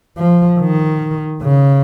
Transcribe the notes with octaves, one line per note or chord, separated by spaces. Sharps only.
F3
D#3
C#3